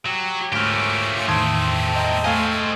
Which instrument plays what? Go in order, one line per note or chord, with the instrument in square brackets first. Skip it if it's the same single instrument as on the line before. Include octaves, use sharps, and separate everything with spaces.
[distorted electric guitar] F#3 [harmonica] G4
[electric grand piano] D2 F6 [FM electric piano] G#2 [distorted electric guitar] A3 G4 [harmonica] A#3 C#4 F4
[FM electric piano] E2 A2 D#3 [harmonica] C4 A4 [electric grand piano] C6 D#6 G#6
[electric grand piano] D#5 G5 A#5
[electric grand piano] A3 F5 G#5 [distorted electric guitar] C5 D#5